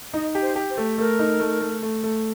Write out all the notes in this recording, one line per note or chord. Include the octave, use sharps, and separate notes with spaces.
D#4 D#5
G4
C5
G4
C5
A3
A3 A#4
D#4
A3
A3
A3
A3